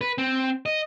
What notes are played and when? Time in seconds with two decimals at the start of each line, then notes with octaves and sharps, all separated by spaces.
0.01 B4
0.18 C4
0.66 D#5